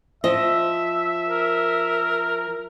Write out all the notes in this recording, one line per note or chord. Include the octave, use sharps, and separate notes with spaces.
F3 D#5 E5
A#4